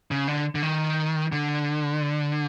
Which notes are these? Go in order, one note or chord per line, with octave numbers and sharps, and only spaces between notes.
C#3
D3
D3
D#3
D3